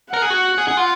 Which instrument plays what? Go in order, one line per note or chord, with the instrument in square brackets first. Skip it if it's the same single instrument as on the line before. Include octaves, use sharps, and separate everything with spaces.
[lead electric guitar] A#4 [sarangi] F#5
[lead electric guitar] G#4
F#4
G#4
G#4
F4